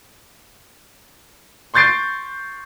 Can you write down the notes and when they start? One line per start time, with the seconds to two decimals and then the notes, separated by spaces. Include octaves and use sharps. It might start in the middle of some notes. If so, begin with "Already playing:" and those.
1.74 C6 C#6 G6 A6 C7 D7